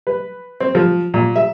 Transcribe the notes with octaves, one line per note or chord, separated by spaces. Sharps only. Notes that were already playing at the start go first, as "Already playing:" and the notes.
B4
C4
F3
A#2
E5